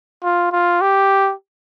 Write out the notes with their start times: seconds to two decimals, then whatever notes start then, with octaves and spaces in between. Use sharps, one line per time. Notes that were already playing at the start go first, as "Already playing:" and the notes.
0.23 F4
0.52 F4
0.81 G4